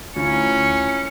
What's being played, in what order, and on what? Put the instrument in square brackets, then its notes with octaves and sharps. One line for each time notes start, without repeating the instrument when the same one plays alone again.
[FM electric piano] D2 [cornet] C#4 [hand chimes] E4 F4 [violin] C#7